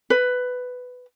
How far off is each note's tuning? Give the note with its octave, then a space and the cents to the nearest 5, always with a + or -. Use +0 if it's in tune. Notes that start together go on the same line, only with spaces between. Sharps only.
B4 +10